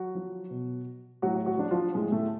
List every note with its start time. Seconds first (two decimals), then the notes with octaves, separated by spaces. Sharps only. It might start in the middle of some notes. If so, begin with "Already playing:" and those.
Already playing: F#3 F#4
0.15 F3
0.50 B2
1.22 A2 F#3 F#4
1.46 F#3 F#4
1.58 F3 D4
1.71 F3 F4
1.94 A2 G#3
2.12 A2 A3